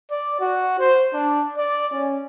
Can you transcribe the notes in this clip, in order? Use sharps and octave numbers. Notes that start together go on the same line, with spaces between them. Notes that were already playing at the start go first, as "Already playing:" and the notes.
D5
F#4
C5
D4
D5
C#4